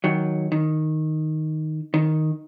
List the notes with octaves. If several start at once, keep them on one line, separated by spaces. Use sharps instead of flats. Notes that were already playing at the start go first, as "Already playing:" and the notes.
D#3 F#3
D#3
D#3